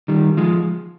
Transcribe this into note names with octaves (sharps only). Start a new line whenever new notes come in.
D#3 G3
F3 G#3